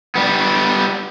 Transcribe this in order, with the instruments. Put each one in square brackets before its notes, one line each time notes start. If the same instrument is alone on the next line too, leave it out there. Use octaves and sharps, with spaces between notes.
[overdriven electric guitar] G3 B3